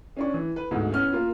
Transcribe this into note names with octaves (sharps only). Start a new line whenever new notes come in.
C#4 D4 C#6
E3
B4
D2 G#2 B2
B3 C#4 F6
A#3 F4